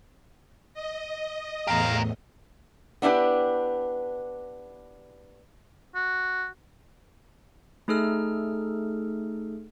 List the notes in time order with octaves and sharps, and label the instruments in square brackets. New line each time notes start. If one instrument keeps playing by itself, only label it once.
[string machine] D#5
[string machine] E2 A2 [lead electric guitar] G4 A#4 [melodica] F5 A#5
[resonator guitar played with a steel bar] B3 D4 E4 G4 B4
[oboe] F#4
[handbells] A3 D#4 G#4 A4 F6